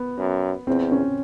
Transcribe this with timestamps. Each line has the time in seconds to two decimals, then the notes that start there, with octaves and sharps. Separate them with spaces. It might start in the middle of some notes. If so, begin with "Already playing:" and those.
Already playing: B3
0.18 F#2
0.67 E2 C4
0.92 C#4